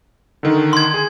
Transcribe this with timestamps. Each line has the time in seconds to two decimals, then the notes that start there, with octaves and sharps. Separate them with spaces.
0.43 D3 D#3
0.73 C6 G#6
0.94 G#4